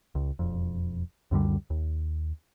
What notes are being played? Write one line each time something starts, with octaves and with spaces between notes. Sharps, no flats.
C#2
E1 F2
C#2 F#2 D3 G3
D#2